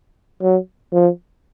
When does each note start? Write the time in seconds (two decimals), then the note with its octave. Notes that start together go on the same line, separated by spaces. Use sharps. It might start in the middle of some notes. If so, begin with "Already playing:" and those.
0.41 F#3
0.93 F3